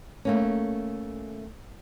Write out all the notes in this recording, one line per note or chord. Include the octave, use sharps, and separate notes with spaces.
A3 A#3 C#4